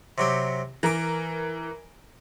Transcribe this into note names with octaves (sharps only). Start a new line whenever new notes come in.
C3 F#3 G4
E3 A#4 A#5 D6